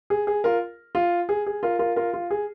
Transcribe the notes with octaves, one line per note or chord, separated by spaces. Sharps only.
G#4
G#4
F4 A#4
F4
G#4
G#4
F4 A#4
F4 A#4
F4 A#4
F4
G#4